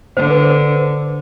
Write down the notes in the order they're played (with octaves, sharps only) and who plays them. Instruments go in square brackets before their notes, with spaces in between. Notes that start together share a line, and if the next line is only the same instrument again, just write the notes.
[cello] D3 [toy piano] C5
[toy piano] B4
C5